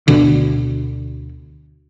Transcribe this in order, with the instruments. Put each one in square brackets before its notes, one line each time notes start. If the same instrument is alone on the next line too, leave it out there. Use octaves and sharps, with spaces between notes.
[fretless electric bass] D2 B2 D3